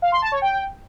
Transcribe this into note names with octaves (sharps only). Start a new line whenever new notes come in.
F5
C6
A5
C#5
G5